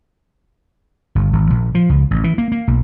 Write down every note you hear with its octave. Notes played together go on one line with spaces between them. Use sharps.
G1
G#1
A#1
F3
C#2
A1
E3
A#3
A#3
B1